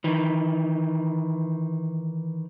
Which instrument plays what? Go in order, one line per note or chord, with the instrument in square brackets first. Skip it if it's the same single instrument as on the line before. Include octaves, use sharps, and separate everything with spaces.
[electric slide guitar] D#3 E3